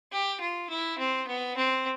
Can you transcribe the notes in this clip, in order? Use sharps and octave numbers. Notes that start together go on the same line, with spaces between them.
G4
F4
E4
C4
B3
C4